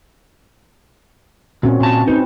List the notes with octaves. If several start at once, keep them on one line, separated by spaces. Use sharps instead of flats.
A#2 C4 C#4 F#4
A#2 A5
C4 D#4 B4